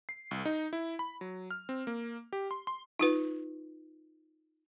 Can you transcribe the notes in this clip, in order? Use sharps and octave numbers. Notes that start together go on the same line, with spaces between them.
C7
C2
D#4
E4
B5
F#3
F6
C4
A#3
G4
C6
C6
D#4 F4 B4